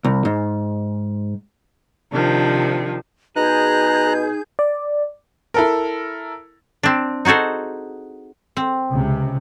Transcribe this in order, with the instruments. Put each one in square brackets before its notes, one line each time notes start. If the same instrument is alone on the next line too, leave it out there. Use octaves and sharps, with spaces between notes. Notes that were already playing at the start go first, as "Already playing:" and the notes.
[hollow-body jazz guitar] C2
G#2
[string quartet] C3 D#3 F3 D4
[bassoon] B2 [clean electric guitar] D#4 [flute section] G#4 G6 [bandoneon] A#5 F#6
[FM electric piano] D5
[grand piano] E4 A4 A#4
[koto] C4 D4
D#4 F#4 G#4 A4 C5
[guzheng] C4
[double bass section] C#2 C3